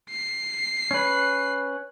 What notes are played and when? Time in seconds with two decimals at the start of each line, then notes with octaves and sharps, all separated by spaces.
0.10 C7
0.91 C#4 B4